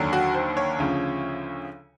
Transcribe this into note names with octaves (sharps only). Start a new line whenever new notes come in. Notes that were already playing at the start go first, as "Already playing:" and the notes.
Already playing: D#2 D3 F#3
F#4
C5
C#5
D2 C#3 F3